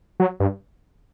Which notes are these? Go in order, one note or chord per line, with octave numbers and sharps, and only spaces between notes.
F#3
G2